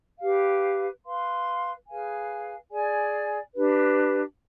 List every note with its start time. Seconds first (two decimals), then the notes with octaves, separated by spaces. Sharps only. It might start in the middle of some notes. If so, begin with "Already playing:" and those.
0.20 G4 B4 F5
1.04 B4 F5 C6
1.88 G#4 B4 F5 G#5
2.71 G#4 D5 G#5
3.55 D4 G4 B4